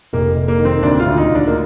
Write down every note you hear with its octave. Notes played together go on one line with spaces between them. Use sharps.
F1 A#3
F1
A#3
D#3
C4
D2 D4
F4
D2
D#4
D2
D4
A#3